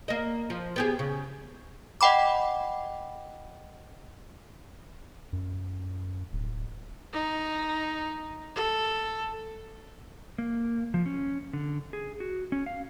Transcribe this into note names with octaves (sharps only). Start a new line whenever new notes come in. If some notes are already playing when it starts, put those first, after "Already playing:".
A#3 D#5
F3
B3 G4 G#4
C#3
D#5 F#5 G5 B5 D6
F#2
D1
D#4
A4
A#3
F3
C#4
D3
G#4
F#4
C#4
F5